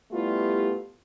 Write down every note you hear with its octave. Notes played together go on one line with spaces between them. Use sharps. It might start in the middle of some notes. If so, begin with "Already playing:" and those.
G3 A3 B3 E4 F4 G4